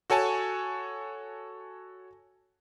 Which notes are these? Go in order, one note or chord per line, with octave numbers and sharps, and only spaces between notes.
F#4 A4 C#5 G#5 A5